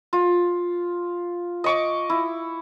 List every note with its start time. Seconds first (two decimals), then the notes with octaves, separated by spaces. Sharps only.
0.13 F4
1.64 D#5 C#6 D6
2.10 E4